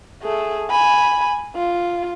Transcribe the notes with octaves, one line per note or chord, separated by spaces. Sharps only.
A3 G#4
G#5 B5
F4